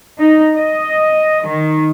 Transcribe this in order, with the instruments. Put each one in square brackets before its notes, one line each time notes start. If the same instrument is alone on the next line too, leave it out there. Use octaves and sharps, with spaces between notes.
[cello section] D#4
D#5
D#3